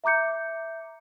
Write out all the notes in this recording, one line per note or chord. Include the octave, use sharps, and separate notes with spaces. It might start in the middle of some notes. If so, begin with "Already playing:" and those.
E5 A#5 D6 G6 C#7